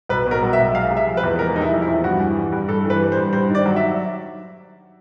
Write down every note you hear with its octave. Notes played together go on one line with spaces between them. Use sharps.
B1 B4
B2 A#4
F#3
E5
B1
G#3 F5
C3
E5
F3
B4
E2
G#3 A#4
C3 D#4
E4
F3
E4
E2
G2 F#4
E3
G3
G2
G2 A4
E3
B4
G3
C5
G2
G2 C5
D#3
D5
F#3
E5